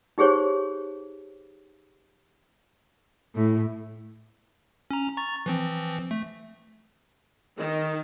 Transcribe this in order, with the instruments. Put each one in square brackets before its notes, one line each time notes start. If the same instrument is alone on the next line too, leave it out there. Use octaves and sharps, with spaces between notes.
[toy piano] D#4 G4 G#4 C5 C#5
[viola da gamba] A2
[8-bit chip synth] C#4 A#5
A#5 C#6 A6
E3 F3 C4
A3
[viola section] D#3